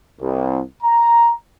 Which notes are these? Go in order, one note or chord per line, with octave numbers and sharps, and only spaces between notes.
C2
A#5